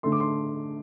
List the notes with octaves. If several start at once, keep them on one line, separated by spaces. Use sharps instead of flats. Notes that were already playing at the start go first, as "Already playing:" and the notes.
D3 A3 C6
D6
C6